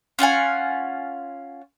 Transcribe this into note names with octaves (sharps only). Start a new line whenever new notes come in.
C#4 F4 F#5 G#5